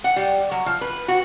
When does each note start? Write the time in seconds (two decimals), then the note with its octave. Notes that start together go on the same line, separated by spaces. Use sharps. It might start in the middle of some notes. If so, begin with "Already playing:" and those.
0.04 F#5
0.16 G3
0.51 F#3
0.66 F3
0.81 B4
1.08 F#4